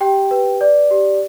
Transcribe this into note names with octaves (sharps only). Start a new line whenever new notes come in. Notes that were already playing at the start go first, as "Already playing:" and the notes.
G4 G5
B4
D5
G4